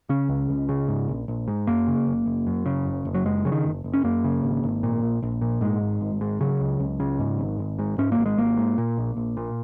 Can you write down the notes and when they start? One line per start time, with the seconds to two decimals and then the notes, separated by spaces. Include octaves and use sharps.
0.09 C#3 C#4
0.29 C#2
0.50 C#2
0.69 C#3
0.88 G#2
1.08 A#1
1.28 A#1
1.48 G#2
1.67 F#2 A#3
1.88 C#3
2.07 F#1
2.26 F#1
2.47 F#2
2.66 C#3
2.86 F#1
3.05 F#1
3.14 F#3
3.25 F#2 G#3
3.45 C#3 F#3
3.52 D#3
3.64 F#1
3.84 F#1
3.94 C#4
4.04 F#2 A#3
4.24 C#3
4.43 G#1
4.64 G#1
4.83 A#2
5.02 A#1
5.22 A#1
5.41 A#2
5.61 G#2 G#3
5.81 G#1
6.01 G#1
6.21 G#2
6.41 C#3 F#3
6.61 C#2
6.80 C#2
7.00 C#3
7.19 G#2
7.39 G#1
7.59 G#1
7.79 G#2
7.98 G#2 C#4
8.12 A#3
8.18 G#1
8.26 G#3
8.37 G#1 A#3
8.57 G#2
8.78 A#2
8.98 A#1
9.17 A#1
9.37 A#2